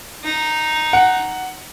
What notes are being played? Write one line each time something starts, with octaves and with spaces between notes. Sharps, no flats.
D#4
F#5